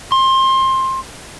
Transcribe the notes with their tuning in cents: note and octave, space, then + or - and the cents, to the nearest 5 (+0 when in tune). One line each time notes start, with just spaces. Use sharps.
C6 +20